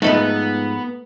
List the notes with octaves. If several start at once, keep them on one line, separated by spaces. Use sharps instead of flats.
G#2 F3 A3 B3 D#4 A4 B4